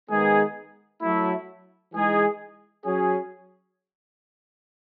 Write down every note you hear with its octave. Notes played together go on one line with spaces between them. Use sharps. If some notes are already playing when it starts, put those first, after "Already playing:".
D#3 G#3 B3 D#4 G#4
F#3 A3 E4
E3 G#3 D#4 G#4
F#3 C#4 G#4